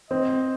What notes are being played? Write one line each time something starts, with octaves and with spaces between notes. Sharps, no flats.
C4 D#5